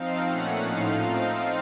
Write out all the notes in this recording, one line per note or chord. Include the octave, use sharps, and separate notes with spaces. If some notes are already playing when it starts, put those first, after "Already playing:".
Already playing: F3 C4 D#4 F5
A#2 A3 C#4 F#5
A2 F3 A3 D#4 F5
F3 C4 D#4 F5